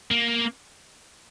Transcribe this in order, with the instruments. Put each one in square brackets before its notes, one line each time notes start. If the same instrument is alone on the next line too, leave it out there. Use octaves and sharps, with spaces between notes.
[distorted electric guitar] A#3